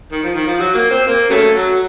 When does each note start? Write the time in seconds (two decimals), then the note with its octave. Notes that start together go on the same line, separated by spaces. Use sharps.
0.12 D#3
0.23 F3
0.35 D#3
0.47 F3
0.59 F#3
0.74 A#3
0.91 C4
1.07 A#3
1.30 C#3 F#3 A3
1.53 F#3